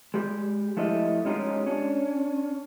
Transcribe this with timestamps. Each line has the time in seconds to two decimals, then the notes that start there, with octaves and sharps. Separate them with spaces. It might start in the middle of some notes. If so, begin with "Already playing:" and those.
0.14 G#3 G4
0.77 F3 A3 E4 G4 D#5
1.25 G#3 C#4 D#4 F4 G4
1.66 C#4 D4